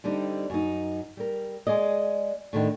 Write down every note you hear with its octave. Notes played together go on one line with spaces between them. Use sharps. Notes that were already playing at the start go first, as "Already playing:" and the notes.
D3 G3 C4 D#4
F#2 D#4
G3 A#4
G#3 G#4 D5 D#5
A2 D3 D#3